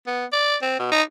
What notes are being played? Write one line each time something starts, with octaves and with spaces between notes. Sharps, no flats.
B3
D5
C4
B2
D#4